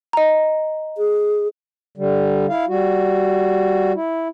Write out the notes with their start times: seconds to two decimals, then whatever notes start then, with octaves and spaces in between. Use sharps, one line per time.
0.13 D#5 A#5
0.98 G#4
1.97 D3 G3
2.49 E4 F5
2.68 G3 F#4
3.95 E4